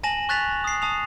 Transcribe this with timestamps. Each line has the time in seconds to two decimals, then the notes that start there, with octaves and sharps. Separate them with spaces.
0.03 G#5 A5 A#6 E7 F#7
0.29 C#6 F#6 A6 B6 F7
0.64 D#6 C7
0.82 A5 D#6 C7 F7